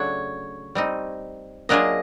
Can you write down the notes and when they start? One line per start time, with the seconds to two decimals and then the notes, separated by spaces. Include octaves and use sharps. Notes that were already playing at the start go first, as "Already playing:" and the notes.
Already playing: C#3 F#3 A3 D4 F#4 C#5
0.75 G3 C4 D#4
1.69 F#3 A#3 D4 F4 G#4 D#5